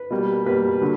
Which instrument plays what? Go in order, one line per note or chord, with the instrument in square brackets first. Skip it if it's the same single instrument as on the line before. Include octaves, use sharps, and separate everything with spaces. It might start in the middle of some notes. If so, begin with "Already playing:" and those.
Already playing: [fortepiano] B4
B2 G3 A#3
B2 G3 A#3 B4
D3 F#3